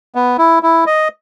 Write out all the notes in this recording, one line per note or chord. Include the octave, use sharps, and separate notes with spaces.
B3
E4
E4
D#5